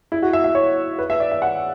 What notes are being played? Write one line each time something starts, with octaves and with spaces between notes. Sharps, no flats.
E4
F#4
E5
E5
C#5
B4
E5
D5
E5
F#5